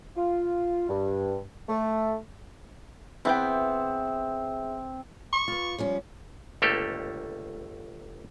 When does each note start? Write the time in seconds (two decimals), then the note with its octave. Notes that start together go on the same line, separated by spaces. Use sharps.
0.16 F4
0.89 G2
1.69 A3
3.25 E3 B3 C4 G#4 E5 G5
5.33 C#6
5.48 F4 B4
5.78 F3 G3 C#4
6.62 G1 C#2 A3 A#3 G4 A4